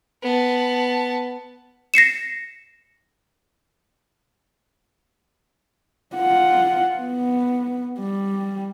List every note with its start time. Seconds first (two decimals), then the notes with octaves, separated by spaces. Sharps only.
0.23 B3 A5
1.94 A#6 C7 C#7 E7
6.16 F4 F#5
6.97 B3
7.99 G3